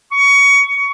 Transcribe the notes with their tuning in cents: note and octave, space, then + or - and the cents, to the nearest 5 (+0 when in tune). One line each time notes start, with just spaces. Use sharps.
C#6 +20